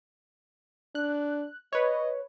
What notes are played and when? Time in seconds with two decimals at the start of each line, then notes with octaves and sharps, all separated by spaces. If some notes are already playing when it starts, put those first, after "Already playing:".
0.95 D4 F#6
1.73 B4 C#5 D#5